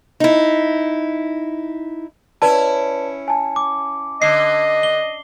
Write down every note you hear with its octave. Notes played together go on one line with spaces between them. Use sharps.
D#4 E4
C#4 E4 B4 D5 A5
G#5 A5
D6
D3 D#5 C7
G7